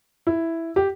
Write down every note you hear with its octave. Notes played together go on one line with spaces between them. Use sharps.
E4
G4